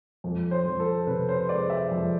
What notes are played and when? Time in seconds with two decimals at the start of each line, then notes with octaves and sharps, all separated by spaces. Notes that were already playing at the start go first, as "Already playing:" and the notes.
0.24 F2
0.51 C5
0.65 F2
0.80 A4
1.07 C3 B4
1.29 C5
1.49 G#3 D5
1.70 E5
1.91 F2